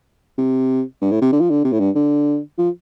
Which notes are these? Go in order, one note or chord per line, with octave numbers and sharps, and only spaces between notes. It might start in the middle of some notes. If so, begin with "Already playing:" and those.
C3
G2
A2
C3
D3
F3
D3
C3
A2
G2
D3
F3